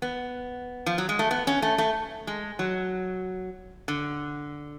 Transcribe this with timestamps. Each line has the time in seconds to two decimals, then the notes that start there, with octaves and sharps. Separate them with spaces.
0.02 B3
0.86 F3
0.98 F#3
1.09 G#3
1.19 A3
1.31 B3
1.47 C#4
1.62 A3
1.78 A3
2.27 G#3
2.59 F#3
3.88 D3